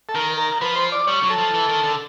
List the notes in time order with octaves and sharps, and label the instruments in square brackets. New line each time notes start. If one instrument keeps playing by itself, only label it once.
[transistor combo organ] A4
[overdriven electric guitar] D#3 [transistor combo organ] A#4
[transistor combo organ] A#4
[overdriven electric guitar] F3 [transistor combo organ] B4
[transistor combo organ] C5
D5
[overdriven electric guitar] G3 [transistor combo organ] C#5
[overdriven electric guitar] F#3
[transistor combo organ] A4
[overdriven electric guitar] F3
E3
D#3
D3